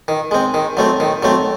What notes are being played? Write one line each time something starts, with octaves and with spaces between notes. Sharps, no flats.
D#3
G#3 C4
D#3
F#3 A3 C4
D#3
F#3 A3 C4